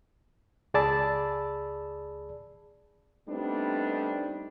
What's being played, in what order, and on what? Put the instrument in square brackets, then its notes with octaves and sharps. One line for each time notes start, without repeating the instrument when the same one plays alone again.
[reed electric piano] C#2 G#4 D5 A5 B5 E6
[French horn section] G3 A3 B3 C4 D4 D#4